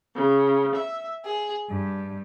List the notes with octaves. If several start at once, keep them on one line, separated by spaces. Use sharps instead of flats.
C#3
E5
G#4
G2